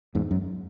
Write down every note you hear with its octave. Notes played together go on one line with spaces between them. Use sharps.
E2 G#2
F#2